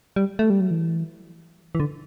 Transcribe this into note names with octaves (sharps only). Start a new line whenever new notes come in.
G3
A3
G3
F#3
E3
E3
D3